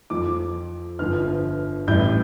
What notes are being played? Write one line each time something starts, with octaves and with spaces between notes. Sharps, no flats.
F2 F3 D6
G1 G2 F3 F6
A1 A2 G3 G6